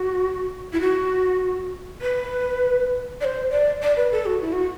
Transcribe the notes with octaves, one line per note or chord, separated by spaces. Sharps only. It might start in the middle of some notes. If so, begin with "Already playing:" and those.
Already playing: F#4
E4
F#4
B4
D5
C5
D5
D5
B4
A4
F#4
E4
F#4